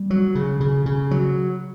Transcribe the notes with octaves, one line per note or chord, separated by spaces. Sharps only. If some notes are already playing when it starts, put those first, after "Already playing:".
Already playing: G3
F#3
C#3
C#3
C#3
F#3